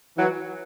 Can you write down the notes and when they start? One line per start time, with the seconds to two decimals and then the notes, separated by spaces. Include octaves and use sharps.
0.17 E3 F#3